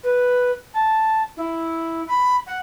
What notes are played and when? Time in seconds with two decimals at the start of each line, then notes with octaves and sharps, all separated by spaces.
0.03 B4
0.74 A5
1.37 E4
2.08 B5
2.47 F#5